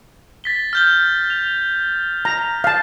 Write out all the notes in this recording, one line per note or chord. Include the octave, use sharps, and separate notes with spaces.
A6 B6 G7
F6 G6 G7
F7
A#5
F5 A5